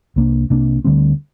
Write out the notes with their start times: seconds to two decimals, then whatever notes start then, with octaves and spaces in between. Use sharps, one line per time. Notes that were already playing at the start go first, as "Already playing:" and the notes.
0.16 C2 C3 A#3 D4
0.50 C2 C3 A#3 D4
0.84 D2 D3 G3 C4